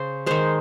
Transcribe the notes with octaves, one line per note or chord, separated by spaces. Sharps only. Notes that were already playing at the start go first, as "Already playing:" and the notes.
Already playing: C#3 C5
D#3 G#3 C5